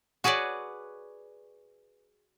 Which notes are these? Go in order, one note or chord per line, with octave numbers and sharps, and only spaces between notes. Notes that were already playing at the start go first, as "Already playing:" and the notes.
F#4 G#4 B4 C#5 D5